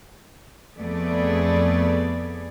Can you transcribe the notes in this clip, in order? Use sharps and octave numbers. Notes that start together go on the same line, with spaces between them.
F2 A3 B3 G#4 D5